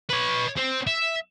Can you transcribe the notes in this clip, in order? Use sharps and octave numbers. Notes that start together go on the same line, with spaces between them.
B4 C#5
C4
E5